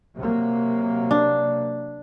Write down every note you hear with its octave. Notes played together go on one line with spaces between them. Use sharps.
C3 F#3 A#3
D4